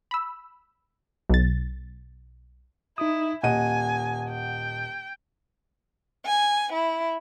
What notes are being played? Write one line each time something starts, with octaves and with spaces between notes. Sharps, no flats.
B5 E6
B1 A6
D#4 E4 D#6
D#1 D#5 F#5 G#5 D#7
G5
G#5
E4